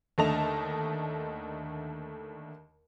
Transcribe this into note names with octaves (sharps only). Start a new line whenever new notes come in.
D#2 D3 A3 D#5 A5 F7